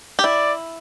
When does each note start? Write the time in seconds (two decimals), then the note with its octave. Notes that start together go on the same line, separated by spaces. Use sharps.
0.19 G4
0.24 E4 D5